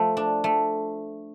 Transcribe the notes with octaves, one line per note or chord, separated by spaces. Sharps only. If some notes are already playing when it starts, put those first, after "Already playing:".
Already playing: F3 A3
D4
A3